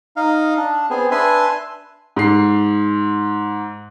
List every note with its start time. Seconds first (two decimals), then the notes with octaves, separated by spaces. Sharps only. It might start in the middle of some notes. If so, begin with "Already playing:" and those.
0.17 D#4 F5
0.57 D4
0.90 B3 C4 G#4
1.11 D4 B4 E5 G#5 C6
2.16 G#2 C7